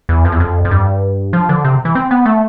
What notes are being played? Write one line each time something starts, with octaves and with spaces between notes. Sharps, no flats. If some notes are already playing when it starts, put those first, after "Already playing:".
E2
F2
E2
F2
F2
G2
F3
D3
C3
E3
C4
B3
A3